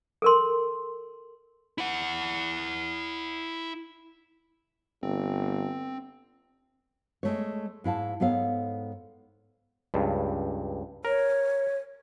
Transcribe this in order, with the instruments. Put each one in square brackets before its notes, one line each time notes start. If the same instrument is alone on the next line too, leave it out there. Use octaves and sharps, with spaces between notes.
[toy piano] A4 A#4 C6
[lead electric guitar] E4 F#5
[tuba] G1 [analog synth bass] C4
[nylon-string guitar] G#3 A3 C#5
G#2 E4 F5 A5
G#2 B3 A4 C#5 F5
[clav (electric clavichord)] C#2 G2
[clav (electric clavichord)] A#4 [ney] C#5